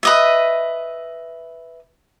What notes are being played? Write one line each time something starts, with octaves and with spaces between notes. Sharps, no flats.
B4 D#5 E5